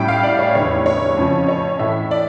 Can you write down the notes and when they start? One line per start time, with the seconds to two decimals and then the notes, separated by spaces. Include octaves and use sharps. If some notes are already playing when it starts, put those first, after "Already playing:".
Already playing: A2 G3 C#4 E4 G5
0.08 F5
0.23 D5
0.39 C#5
0.55 F1 E2 D3 C#5
0.86 C#5
1.17 F2 C#3 F3 C#4
1.48 C#5
1.79 A2 E3 A3 E5
2.11 D5